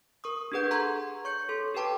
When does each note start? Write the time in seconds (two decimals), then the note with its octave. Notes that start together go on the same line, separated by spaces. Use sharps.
0.24 A#4 C#6 D#6
0.52 D4 G4 G#4 B4 F#5 G6
0.71 A4 A#5 C6 C#6 G#6
1.25 C#5 C#6 G6 C#7
1.49 A4 C6
1.74 G4 A4 B4 G5 A5 D6